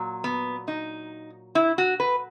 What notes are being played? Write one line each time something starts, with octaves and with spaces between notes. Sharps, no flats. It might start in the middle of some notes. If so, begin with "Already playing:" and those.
Already playing: A#2 F#3
B3
D#4
E4
F#4
B4